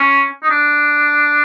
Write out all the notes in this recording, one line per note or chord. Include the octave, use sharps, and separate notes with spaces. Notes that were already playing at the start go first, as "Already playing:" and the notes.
Already playing: C#4
D#4
D4